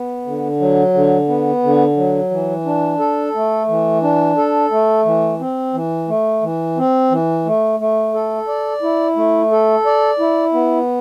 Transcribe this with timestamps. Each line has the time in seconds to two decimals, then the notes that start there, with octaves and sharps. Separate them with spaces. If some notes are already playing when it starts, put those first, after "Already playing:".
Already playing: B3
0.26 D3
0.60 F#3
0.94 D3
1.28 B3
1.63 D3
1.97 F#3
2.31 E3
2.65 D4
2.99 A4
3.35 A3
3.68 E3
4.03 D4
4.37 A4
4.71 A3
5.05 E3
5.40 C4
5.73 E3
6.08 A3
6.42 E3
6.77 C4
7.11 E3
7.46 A3
7.80 A3
8.14 A4
8.48 D5
8.82 E4
9.16 A3
9.52 A4
9.86 D5
10.19 E4
10.53 B3